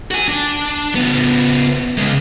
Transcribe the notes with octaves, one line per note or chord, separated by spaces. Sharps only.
F#4 G#5
D4
C#3 B3
C#3 G#3